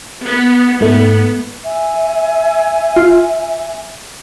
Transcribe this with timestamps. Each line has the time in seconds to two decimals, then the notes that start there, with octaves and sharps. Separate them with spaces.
0.24 B3
0.80 G#2 A3 B3
1.63 E5 G#5
2.96 F4